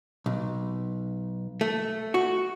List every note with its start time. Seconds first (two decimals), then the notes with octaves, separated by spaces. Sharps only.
0.26 B1
1.61 A3
2.14 F#4